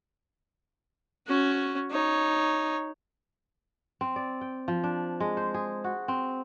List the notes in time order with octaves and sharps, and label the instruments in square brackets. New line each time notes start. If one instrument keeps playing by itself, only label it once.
[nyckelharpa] C#4 F#4
D#4 C#5
[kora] C4
D5
G5
F3
D4
G#3
C5
G#4
F#4
C4